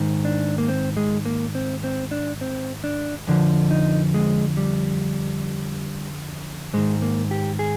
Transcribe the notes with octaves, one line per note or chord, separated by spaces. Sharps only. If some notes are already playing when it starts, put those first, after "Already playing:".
Already playing: G#2 D#3
D4
A#3
C4
G#3
A#3
C4
C4
D4
C4
D4
F2 D3 F3
D#4
G#3
G3
G#2 D#3 G#3
A#3
G4
G#4